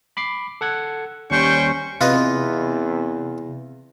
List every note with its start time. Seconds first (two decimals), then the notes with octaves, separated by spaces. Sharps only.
0.17 B5 D6 C7
0.61 A4 F#5 G#6
1.31 D#2 G3 C#4 C5 G5 C#6
2.01 E2 C3 F4 B4 D#5